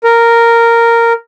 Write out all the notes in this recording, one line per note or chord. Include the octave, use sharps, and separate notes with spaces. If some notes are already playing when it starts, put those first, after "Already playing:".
A#4